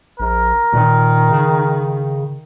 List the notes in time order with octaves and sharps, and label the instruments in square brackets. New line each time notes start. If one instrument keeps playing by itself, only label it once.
[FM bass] A#1 [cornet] A#4
[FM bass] A#2 [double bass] D#3
[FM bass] C#3